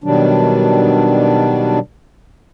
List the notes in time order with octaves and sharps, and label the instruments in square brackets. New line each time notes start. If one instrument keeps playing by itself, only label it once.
[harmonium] B2 D#3 F#3 G3 D4